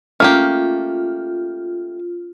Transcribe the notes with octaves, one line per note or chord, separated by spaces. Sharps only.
A3 A#3 C#4 F4 G4 F6